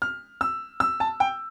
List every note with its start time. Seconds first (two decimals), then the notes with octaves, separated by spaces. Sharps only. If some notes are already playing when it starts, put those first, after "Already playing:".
0.02 F6
0.41 E6
0.80 E6
1.00 A5
1.20 G5